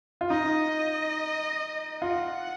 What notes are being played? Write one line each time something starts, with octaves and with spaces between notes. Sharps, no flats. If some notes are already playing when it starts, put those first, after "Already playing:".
F4
D#4 D#5
F4 F#5